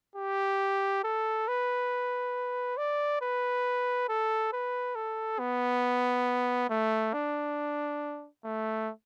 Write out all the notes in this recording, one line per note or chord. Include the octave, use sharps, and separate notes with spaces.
G4
A4
B4
D5
B4
A4
B4
A4
B3
A3
D4
A3